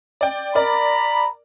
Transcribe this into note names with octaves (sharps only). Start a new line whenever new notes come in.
D5 G5
A#4 D5 A#5 B5